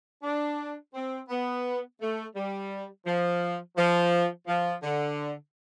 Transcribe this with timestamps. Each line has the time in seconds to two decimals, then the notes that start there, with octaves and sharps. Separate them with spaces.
0.23 D4
0.94 C4
1.29 B3
2.00 A3
2.35 G3
3.06 F3
3.76 F3
4.47 F3
4.82 D3